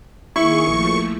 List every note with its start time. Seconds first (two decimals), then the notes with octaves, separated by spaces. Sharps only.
0.36 D#3 A#3 E4 G#4 C#6
0.67 A#1 F3 A3 A#3